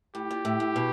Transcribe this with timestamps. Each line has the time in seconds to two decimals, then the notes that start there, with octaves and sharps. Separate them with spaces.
0.15 A2 G4
0.31 A#2
0.45 A2
0.60 A2
0.76 B2